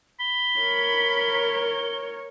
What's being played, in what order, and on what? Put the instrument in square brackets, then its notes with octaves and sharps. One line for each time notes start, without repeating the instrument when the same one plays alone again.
[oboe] B5 [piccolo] G7
[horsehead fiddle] A#4 C#5